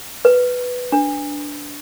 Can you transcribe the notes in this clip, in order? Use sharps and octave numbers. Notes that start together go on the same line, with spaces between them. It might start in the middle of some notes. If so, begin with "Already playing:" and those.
B4
D4